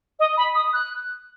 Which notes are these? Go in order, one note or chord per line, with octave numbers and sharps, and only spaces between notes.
D#5
B5
D#6
F#6